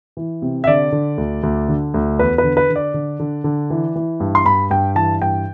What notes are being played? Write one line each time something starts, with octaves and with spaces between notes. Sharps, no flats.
E3
C3
E5
D3 D5
D3
D2
D2
D3
D2
E2 B4
B4
D3
B4
D3
D5
D3
D3
D3
E3
E3
G2
C6
G2 B5
G2 G5
E3 A5
G2 G5